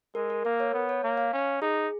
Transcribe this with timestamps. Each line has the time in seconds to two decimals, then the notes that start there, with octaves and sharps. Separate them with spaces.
0.15 G#3 A#4
0.30 A#4
0.45 A#3 A#4
0.60 C#5
0.74 B3
0.89 C#5
1.04 A#3
1.17 F5
1.33 C#4
1.61 D#4 G#4